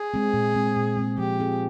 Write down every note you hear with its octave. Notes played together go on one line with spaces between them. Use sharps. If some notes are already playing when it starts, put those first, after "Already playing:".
Already playing: G#4
G#3 C4
A#2
G#3 C4
A#2
G#3 C4
F3 G4
C4 F4 G#4